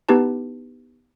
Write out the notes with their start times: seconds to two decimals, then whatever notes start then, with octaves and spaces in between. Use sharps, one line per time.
0.09 B3 D#4 E4 G4 B4 A5